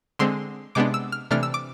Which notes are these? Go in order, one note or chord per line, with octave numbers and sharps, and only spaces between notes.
D3 G#3 C4 C6
C3 G#3 B3 D4 D6
E6
F6
C3 E3 A3 D4 F6
E6
D6